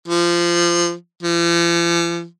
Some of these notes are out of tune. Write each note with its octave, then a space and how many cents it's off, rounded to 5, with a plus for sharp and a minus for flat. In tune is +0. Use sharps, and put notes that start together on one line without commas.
F3 -20
F3 -45